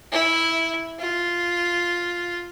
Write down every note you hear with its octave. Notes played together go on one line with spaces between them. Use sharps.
E4
F4